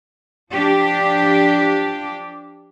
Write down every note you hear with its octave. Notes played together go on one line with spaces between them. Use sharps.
F3 D4 G4